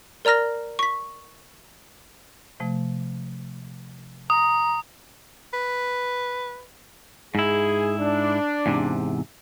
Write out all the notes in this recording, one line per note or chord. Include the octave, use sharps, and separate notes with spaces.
A#4 D5 A#5 F6 A#6
C#6 B6
C3 F3 A3
A#5 D#6
B4
G#2 E4 G#4
D4
E2 G#2 C3